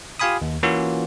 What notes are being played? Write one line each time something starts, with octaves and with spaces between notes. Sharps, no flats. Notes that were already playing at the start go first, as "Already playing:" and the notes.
F4 G4 F5 G#5 B5 D#6
D#2
E3 A#3 C#4 F4 F#4